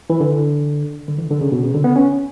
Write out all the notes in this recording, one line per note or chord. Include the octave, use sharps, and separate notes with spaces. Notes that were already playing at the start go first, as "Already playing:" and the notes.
E3
D3
D3
E3
D3
C#3
B2
C#3
D3
B3
C#4